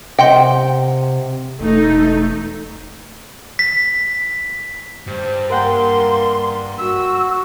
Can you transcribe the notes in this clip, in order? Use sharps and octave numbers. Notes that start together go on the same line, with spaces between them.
C3 D#5 F#5 G5 C6
E1 A3 D#4
B6
G2 C5
A#3 A#4 F#5 G5 C6
F#4 E6